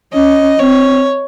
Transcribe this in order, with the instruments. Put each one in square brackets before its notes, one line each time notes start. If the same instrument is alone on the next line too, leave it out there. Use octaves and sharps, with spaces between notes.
[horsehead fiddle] C#4 [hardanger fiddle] D#5
[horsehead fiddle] C4 [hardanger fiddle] C#5